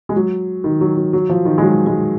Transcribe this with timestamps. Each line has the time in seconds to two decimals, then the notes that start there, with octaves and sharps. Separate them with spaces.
0.09 G#3
0.16 F#3
0.64 D#3
0.81 F#3
0.97 F#3
1.13 F#3
1.29 F3
1.45 D#3
1.58 G#3
1.62 F#3
1.87 G#3